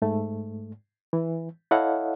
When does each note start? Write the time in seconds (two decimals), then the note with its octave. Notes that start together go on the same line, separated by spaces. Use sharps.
0.02 G#2 A3
1.13 E3
1.71 E4 A4 C#5 D#5 F5 F#5